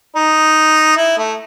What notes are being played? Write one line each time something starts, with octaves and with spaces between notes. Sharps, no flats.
D#4
E4
A3